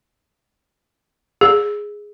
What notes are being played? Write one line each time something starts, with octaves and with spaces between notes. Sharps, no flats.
G#4